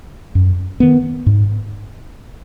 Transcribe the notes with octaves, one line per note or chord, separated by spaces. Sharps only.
F#2
D#3 B3
G#2